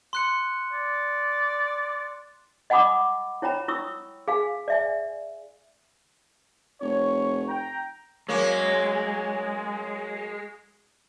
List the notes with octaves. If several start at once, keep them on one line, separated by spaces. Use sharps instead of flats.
C6 F#6 C#7
D5
D#5 F#5 G#5 B5 D6 D#6
E4 C#5 G5 A#5 B5
E4 C#6 D#6 E6
G#4 F5 G#5
D5 E5 G#5
F1 C#5
G5 A#5
F#3 G#3 A#3 C#4